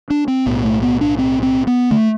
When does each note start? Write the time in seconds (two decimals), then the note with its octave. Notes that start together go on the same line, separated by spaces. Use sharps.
0.10 D4
0.28 C4
0.46 B1 A2 B3
0.65 A3
0.83 B3
1.01 D4
1.18 C4
1.43 C4
1.67 B3
1.91 D3 A3